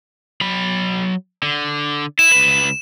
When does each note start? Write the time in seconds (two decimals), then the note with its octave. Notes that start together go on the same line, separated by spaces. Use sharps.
0.41 F#3 B5
1.43 D3
2.19 E4 E7
2.32 C#2 B4